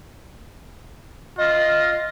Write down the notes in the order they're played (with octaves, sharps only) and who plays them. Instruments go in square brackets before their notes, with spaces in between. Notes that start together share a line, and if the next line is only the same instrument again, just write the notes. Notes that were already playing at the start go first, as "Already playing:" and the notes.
[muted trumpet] F4 [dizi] D#5